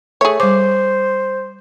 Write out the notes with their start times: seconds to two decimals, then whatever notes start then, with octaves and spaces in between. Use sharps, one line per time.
0.21 A3 G#4 C#5
0.40 G3 C5 D6